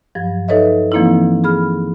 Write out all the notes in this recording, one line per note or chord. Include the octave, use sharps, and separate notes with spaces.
G2 F3 F#3 G#6
D#4 A4 B4 C#5 D#5 E5
E3 F3 A#3 C4 D#4 E4
G#4 B5 F6